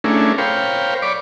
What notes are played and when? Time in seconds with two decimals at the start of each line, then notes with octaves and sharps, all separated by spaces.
0.04 A3 C#4 D4 E4 G#4 A#4
0.38 A#4 C5 C#5 F5 G5 B5
1.02 C#5 D5 B5 D6